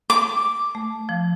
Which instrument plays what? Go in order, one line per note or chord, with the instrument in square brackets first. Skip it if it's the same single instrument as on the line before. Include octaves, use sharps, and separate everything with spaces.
[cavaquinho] D6
[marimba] A3
F3